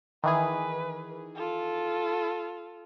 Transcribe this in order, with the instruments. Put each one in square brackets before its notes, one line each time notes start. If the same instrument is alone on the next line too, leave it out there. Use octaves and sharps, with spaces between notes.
[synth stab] D#3 E3 G#4 [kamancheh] B4
[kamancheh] F4 A4